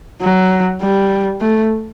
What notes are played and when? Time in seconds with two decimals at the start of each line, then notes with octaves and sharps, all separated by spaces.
0.21 F#3
0.81 G3
1.41 A3